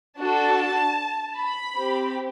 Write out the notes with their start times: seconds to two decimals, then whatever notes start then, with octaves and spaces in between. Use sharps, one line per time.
0.18 D4 F#4 A4 A5
1.36 B5
1.75 C4 G4